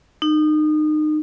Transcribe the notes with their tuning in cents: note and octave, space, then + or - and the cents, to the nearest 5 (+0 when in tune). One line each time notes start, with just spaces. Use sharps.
D#4 -30